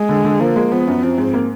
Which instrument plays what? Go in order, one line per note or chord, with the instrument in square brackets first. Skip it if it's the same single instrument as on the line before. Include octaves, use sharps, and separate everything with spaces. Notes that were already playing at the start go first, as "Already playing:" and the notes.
Already playing: [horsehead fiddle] G#3
[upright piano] D3
D3
[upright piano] F3 [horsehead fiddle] A#3
[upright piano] G#3
[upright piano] F3 [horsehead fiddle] B3
[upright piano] F#2
[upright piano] F3 [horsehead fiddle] C4
[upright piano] G#2
A#3